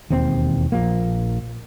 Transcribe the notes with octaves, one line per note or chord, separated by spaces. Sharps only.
E1 D#2 C4
A#1 F3 A#3